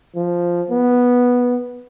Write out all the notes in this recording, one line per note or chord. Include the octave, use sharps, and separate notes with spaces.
F3
B3